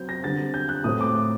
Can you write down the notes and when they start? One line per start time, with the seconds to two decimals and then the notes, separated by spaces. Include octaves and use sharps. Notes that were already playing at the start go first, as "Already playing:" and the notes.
Already playing: F#3 C4 G6
0.09 A#6
0.24 D3 G3 C4 A6
0.54 G6
0.69 F#6
0.84 A2 A3 C4 D#6
1.01 D6